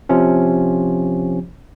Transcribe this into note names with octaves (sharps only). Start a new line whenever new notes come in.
C3 F3 C#4